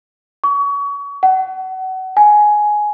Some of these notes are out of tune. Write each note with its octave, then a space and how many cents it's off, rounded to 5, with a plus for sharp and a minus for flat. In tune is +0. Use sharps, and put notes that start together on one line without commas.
C#6 +30
F#5 +30
G#5 +10